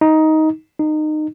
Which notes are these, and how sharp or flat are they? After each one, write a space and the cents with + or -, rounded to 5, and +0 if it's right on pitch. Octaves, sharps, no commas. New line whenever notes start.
D#4 +15
D#4 -20